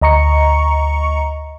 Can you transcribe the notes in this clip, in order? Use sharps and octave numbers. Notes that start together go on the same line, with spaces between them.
D2 D#5 A#5 C#6 C#7